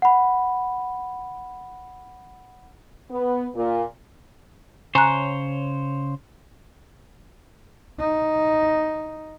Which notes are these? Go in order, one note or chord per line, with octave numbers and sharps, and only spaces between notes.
F#5 B5
B3
A#2
C#3 C5 C#5 G#5 A#5 F#6
D#4